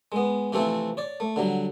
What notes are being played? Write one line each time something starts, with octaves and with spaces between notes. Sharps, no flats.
G#3 B3
C3 E3 F3 A3 C4 E4
C#5 D5
A3
D3 F#3 G3